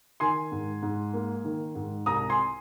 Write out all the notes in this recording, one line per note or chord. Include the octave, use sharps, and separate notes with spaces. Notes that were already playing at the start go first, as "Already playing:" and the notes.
D#3 G#5 C6
G#2
G#2
A#3
D#3
G#2
C2 A#5 D#6
G#5 C6